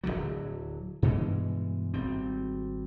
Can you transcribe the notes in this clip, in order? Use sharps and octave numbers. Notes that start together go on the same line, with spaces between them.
D1 C#2 D3 F#3
G2 B2 E3 G#3
G#1 G3 C4